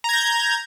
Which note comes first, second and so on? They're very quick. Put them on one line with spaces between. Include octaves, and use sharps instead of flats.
A#5 G#6 G6